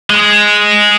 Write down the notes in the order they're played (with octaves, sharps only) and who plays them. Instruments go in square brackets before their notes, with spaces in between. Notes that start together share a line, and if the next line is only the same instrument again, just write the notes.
[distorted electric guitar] G#3